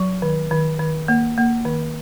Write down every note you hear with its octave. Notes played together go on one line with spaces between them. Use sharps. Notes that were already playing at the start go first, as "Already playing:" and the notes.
Already playing: F#3
D#3
D#3
D#3
A#3
A#3
D#3